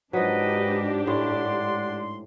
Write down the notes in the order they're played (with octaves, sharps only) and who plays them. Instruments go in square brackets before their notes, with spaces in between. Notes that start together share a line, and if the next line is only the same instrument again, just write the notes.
[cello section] G#2 [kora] F3 F#3 [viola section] D4 G4 [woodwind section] D#4 B4 D#5
[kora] A2 [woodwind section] D5 F#5 C6